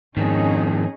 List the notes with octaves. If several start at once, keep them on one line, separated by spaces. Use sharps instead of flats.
F2 G#2 D#3 C#4 D#4 G#4